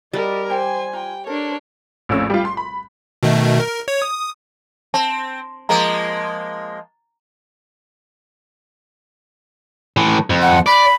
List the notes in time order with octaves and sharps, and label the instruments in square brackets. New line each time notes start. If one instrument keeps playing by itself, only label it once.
[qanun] G3 [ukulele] F#4 C5 [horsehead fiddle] A#4 D#5
[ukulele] G4 G5 [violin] C5 [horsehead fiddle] G#5
[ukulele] F4 A#5 [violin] G5
[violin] D4 C#5 [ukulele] A4 [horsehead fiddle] A#4
[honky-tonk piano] A#1 F2 A2 C#4 E6
G3 F4
C6
B5
[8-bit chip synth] B2 D#3 A3
A#4
C#5
D#6
[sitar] C4 [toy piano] A5
[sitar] F3 G#3 A#3 [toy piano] A#5
[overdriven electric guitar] A2 E3
F2
[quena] F#5
[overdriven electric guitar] D5 [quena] B5